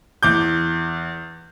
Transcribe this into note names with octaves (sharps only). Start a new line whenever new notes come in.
E2 D6 G6